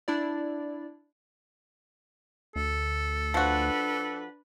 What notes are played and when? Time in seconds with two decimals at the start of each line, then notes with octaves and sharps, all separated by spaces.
0.08 D4 E4 D5
2.56 D2 A4
3.34 F3 D4 F#4 B4